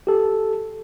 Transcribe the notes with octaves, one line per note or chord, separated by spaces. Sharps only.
G4 A4